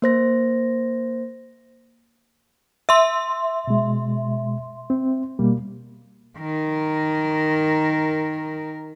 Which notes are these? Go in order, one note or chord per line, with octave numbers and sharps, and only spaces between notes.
A#3 C5 A#6
E5 C6 E6
B2 G#3
C4
B2 G3 A#3
D#3 A#4